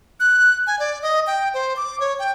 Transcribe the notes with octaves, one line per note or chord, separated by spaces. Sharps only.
F#6
G#5
D5
D#5
G5
C5
D6
C#5
G5